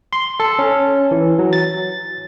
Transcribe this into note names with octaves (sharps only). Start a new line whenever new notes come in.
C6
A4
C#4
E3
F#3
A6